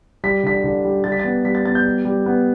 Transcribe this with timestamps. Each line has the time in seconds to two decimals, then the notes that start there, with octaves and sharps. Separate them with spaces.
0.24 G3 B6
0.43 D3 B6
0.64 D3
0.84 G3
1.04 G3 A6
1.12 B6
1.19 A6
1.24 B3
1.44 G3 B6
1.55 A6
1.65 B3 A6
1.75 G6
1.85 G3
2.05 G3
2.26 B3